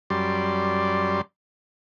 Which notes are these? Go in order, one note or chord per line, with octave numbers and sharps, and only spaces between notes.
F#2 G3 D5 C6